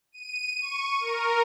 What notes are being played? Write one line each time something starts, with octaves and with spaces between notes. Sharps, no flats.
D#7
C#6
A#4